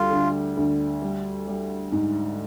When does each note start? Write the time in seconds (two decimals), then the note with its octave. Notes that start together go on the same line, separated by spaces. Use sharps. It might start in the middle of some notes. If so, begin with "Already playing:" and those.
Already playing: D2 G3 F4
0.11 D3
0.57 D2
1.02 G3
1.47 G3
1.92 G#2